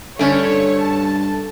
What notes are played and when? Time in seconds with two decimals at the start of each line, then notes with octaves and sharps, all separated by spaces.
0.19 G2 D3 A3 C#4 C#5 D5
0.82 A5